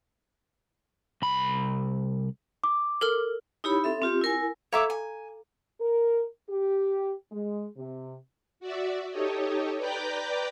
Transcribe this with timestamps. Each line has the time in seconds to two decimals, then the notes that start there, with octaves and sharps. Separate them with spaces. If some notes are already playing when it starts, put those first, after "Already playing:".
1.22 C2 B5
2.64 D6
3.01 A4 A#4 F6
3.64 D#4 E4 G4 C#5 B5
3.84 C4 A4 E5
4.02 C4 F4 G4
4.22 E4 A#4 G#5
4.73 A4 C#5 E5 F5 A#5 D6
4.90 G#5
5.80 A#4
6.49 G4
7.31 G#3
7.76 C3
8.60 F#4 D5 E5
9.10 D#4 G4 A4 C#5 D#5
9.77 B4 D5 G5 A#5 D6 G6